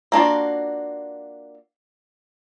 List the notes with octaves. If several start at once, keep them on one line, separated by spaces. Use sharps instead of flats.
A#3 D4 F4 F#4